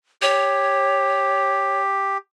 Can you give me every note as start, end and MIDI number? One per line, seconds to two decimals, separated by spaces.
0.22 2.17 67
0.22 1.81 73